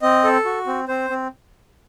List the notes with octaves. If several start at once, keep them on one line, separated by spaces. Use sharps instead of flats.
C4 D#5
A4
F#4
C4
C4 C5
C4